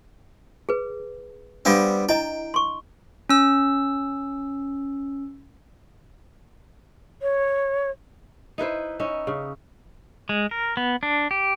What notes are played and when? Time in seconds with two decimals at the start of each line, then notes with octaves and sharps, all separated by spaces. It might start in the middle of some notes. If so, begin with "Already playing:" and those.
0.69 G#4 B4
1.65 G3 B3 C4 D4 D5 F5
2.09 E4 D#5 G5 A#5
2.54 C6 C#6
3.30 C#4 E6
7.22 C#5
8.58 D#4 E4 B4 C5
8.99 C#4 D#4 E5
9.27 C#3
10.29 G#3
10.51 A#4
10.77 B3
11.03 D4
11.31 G4